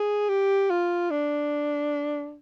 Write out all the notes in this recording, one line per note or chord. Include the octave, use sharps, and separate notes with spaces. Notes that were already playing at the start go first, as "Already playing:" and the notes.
Already playing: G#4
G4
F4
D4